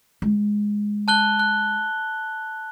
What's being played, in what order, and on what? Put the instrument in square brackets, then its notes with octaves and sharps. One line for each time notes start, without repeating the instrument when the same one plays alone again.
[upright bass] G#3
[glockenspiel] A5 F#6 G7
F#6